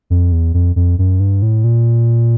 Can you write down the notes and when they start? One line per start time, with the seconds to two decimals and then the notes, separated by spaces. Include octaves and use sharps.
0.10 F2
0.32 E2
0.54 F2
0.76 F2
0.98 F#2
1.20 G2
1.42 A2
1.64 A#2